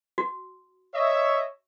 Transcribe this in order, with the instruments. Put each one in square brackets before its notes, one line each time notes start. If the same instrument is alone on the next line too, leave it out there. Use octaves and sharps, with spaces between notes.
[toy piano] F#4
[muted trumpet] C#5 [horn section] D#5 E5